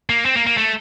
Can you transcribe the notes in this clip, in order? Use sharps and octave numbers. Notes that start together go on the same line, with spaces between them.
A#3
C4
A#3
A#3
A3